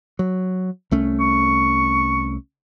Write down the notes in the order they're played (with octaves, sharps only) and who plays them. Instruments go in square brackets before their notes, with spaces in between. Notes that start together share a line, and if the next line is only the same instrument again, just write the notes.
[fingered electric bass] F#3
C2 A3 C#4
[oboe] C#6